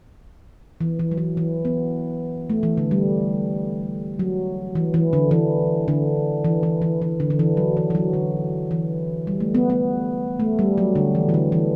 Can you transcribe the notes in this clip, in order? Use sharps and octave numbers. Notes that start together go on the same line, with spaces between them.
E3
E3
F#3
E3
E3
B3
A3
E3
D3
G3
F#3
E3
E3
D3
E3
D3
E3
E3
E3
E3
D3
D3
E3
F#3
E3
E3
F#3
D3
E3
G3
A3
B3
B3
A3
G3
F#3
D3
E3
E3
D3
E3